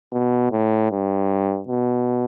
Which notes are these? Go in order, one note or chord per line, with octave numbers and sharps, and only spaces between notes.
B2
A2
G2
B2